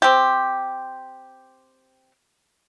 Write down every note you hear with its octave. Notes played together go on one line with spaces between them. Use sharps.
C4 G4